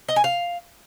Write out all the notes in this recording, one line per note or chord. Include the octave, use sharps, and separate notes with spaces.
D#5
G#5
F5